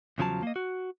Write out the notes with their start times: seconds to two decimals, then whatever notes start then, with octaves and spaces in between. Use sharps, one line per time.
0.18 E2 C#3 F3 F#3 A5
0.43 A#3 D#5
0.56 F#4